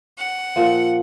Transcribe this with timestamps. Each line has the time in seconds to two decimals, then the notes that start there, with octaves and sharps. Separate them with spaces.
0.17 F#5
0.56 A#2 F3